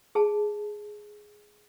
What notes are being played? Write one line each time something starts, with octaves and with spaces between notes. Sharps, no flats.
G#4 A5